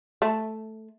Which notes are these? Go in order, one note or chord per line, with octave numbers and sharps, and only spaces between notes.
A3